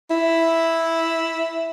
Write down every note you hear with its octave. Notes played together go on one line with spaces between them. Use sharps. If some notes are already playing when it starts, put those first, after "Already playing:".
E4